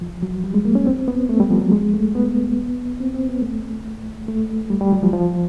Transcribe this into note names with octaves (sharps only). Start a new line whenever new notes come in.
F3
F#3
G3
G#3
A#3
C#4
C4
B3
A3
G3
F3
F#3
G#3
A3
B3
C4
C4
B3
A3
A3
G3
G3
F#3
F3
F3